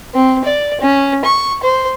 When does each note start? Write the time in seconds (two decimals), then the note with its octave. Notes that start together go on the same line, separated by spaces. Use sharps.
0.14 C4
0.45 D5
0.81 C#4
1.25 C#6
1.63 C5